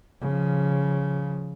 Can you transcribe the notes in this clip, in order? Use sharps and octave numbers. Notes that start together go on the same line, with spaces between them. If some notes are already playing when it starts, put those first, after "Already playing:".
C#3 F3